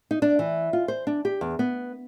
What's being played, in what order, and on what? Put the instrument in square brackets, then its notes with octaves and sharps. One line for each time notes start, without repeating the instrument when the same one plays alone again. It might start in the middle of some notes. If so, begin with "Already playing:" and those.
[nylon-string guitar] D#4
D4
E3
F4
C5
D4
G4
E2
B3